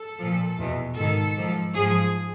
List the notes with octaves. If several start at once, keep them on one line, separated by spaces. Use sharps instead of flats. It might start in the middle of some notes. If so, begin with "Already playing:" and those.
Already playing: A4
A#2 F3
E2 B2
G#2 D#3 A4
G#2 F3
G#2 F3 G#4